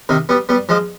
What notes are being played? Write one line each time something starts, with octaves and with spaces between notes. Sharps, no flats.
C3 D#3
G3 B3
G3 B3
F3 G#3